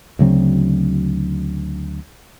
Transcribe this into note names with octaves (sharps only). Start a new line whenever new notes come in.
D2 C#3 F#3 C4